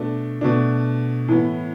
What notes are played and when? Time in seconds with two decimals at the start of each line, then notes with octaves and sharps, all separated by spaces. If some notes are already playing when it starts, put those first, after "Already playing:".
Already playing: B2 A3 D4
0.41 B2 A3 D4
1.28 A2 E3 B3